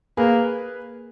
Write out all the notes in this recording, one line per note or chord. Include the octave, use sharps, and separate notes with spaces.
A#3 G#4 B4